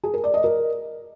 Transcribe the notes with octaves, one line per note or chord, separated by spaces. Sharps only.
G#4
A#4
D5
D#5
A#4